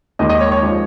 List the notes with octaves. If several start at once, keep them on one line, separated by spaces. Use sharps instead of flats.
D#2 D#3 G#3 D#5
D#5
C#5
C#5
F3 G#3